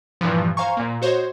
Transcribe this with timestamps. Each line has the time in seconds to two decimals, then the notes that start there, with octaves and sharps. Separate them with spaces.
0.21 G2 A#2 E3 F3
0.57 C5 F5 G#5 A#5 C#6
0.77 A#2 A#3
1.02 F#4 C5 C#5 D#5